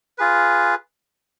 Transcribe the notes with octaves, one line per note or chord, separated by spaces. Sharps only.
F4 G#4 B4